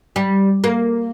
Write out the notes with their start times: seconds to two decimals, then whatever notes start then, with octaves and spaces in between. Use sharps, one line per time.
0.16 G3
0.64 A#3